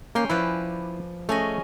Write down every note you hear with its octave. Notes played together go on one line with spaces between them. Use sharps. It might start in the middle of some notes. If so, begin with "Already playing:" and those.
A#3 C#4 G5 C6
F3 E4 B4 D5
A3 C#4 G#4 D#5